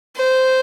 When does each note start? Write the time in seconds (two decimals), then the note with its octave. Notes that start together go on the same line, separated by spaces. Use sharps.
0.17 C5